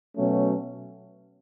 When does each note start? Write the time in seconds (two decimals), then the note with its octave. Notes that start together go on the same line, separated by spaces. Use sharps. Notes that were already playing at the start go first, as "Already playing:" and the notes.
0.16 B2 F#3 A3 C#4